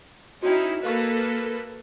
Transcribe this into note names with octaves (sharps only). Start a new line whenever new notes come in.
C#4 D#4 E4 F#4 G5
A#3 A4 B4 D#5 F5 C#6